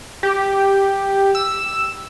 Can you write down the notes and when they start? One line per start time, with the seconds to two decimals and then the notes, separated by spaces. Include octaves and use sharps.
0.23 G4
1.35 E6